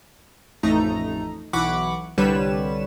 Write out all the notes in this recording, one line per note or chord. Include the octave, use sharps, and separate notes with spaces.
A1 F2 A3 D#4 A#5
B1 E3 F#5 B5 C#6 D6
C2 D3 G3 B4 C#5 E7